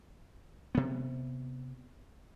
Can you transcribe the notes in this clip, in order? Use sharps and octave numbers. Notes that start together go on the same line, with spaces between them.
C3 B3